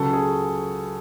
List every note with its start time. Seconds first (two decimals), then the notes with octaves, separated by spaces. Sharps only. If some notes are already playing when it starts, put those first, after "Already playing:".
Already playing: C#2 C#3 F#3 A4
0.13 G#4